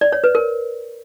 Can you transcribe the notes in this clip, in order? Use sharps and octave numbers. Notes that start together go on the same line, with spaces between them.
D5
C#5
B4
A#4